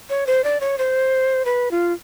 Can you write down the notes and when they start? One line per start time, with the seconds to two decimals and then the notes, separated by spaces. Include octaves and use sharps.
0.10 C#5
0.27 C5
0.44 D5
0.61 C#5
0.78 C5
1.45 B4
1.71 F4